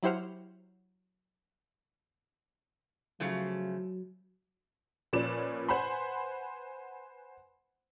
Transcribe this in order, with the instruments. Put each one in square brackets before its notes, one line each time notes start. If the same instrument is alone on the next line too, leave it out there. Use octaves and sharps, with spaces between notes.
[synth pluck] F#3 E4 G4 C5 F#5 F6
[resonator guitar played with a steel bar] C#3 F3 A3 [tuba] F#3
[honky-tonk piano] A#2 F3 C#4 B4 D5 E7
B4 C5 F#5 G#5 B5 C6